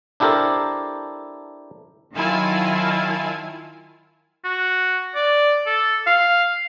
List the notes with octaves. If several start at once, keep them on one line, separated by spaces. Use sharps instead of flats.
D4 E4 G4 A4 A#4 C5
D#3 F#3 E4 F4 G#5 A5
F#4
D5
A4
F5